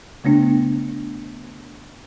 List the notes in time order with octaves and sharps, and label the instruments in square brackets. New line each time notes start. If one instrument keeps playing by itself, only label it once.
[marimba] C#3 A3 B3 D4